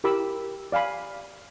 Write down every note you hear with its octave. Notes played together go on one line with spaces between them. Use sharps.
E4 G4 A#4 B5 D6 E6
D5 F5 G#5 B5